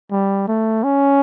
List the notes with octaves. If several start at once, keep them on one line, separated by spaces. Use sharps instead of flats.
G3
A3
C#4